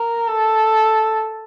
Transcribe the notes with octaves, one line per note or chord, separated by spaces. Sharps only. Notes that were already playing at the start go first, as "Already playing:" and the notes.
Already playing: A#4
A4